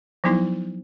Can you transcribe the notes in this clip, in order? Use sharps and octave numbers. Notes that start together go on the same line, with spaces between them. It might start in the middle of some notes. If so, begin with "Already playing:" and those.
F3 F#3 B3 D#4 E4